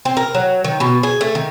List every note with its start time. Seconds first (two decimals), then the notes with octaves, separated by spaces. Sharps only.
0.05 C4
0.17 A#4
0.35 F#3
0.64 D#3
0.80 B2
1.03 G#4
1.21 A3
1.35 D#3